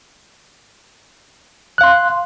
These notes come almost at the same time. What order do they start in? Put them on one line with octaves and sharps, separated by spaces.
F#6 F5 C6